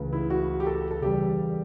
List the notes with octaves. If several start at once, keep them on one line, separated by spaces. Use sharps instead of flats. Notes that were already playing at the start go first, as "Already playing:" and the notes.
Already playing: C#2 C#3 E3 A3
E4
F#4
G4
A4
A4
E2 C#3 G3 G4